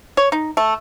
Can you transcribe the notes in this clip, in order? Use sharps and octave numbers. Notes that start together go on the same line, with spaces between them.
C#5
D#4
A3